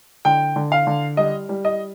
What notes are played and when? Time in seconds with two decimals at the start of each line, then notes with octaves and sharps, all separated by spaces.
0.25 D3 G5
0.56 D3
0.72 F5
0.87 D3
1.17 G3 D#5
1.49 G3
1.65 D#5